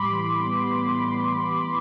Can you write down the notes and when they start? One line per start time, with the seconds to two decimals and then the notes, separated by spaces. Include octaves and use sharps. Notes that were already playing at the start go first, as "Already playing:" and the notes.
Already playing: A2 G3 B5 C6 D6
0.10 E3
0.40 B3
0.71 A2
1.02 G3